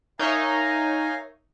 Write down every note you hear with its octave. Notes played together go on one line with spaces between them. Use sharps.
D#4 A#4 C#5 E5 F5 G#5 A#5